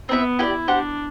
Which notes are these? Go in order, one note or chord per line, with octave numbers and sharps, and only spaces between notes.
B3 C4 E4 B4 E5
E4 G4 B4 D5
D4 G4 C5 F#5